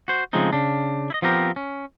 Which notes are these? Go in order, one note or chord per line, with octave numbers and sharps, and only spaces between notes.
F#4 C5
C#3 F3 G#3 A3 C4 D#4
C#3 D4
E4 D#5
F3 B3 C4 G4 A#4
C#4